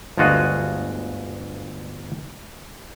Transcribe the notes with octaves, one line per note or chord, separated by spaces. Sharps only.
G1 D2 G#3 F4 F#4 D#5